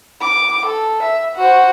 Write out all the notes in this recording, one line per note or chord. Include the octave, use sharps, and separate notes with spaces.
D6
A4
E5
F#4 C5